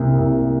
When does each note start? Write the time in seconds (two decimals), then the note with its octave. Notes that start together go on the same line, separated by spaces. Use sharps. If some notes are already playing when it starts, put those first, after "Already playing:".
Already playing: C2 C3 A#3
0.18 C2